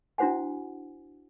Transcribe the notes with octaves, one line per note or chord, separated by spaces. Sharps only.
D4 E4 F#4 C5 F#5 G#5